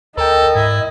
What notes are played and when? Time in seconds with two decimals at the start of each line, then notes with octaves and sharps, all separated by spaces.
0.17 D2 A4 A#4 D#5 G5
0.55 G#2 E4